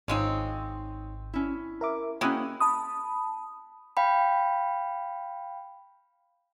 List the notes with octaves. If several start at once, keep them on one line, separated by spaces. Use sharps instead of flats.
G#1 F3 G#3 C4 D#4 C#5
C#4 E4
A#4 E5 D6
G#3 A#3 C#4 E4 F#4 G5 D#6 F#6
A5 B5 D#6
F5 G5 B5